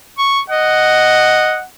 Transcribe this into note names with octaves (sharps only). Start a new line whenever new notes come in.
C#6
D#5 F#5